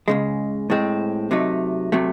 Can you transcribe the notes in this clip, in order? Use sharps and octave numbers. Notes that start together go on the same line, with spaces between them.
C#2 C#3 G#3
A2 G#3 C4
C3 F#3 A3 D#4
C3 F#3 A3